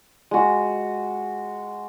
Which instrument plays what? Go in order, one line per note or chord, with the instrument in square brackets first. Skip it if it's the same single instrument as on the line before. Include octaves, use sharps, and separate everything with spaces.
[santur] G#3 F#4